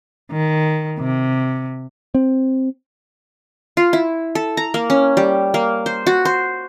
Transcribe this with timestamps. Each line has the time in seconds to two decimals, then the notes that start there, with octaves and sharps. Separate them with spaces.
0.32 D#3
0.99 C3
2.15 C4
3.77 F4
3.93 E4
4.35 A4
4.57 A#5
4.74 A#3
4.90 C#4
5.17 G3
5.54 A#3
5.86 C5
6.07 F#4
6.25 C5